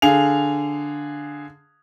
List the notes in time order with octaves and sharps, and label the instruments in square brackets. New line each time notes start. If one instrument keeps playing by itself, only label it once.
[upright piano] D3 G#4 F5 F7